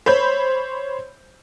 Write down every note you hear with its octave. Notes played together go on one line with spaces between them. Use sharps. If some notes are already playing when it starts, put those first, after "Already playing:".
C5 C#5 B5 G6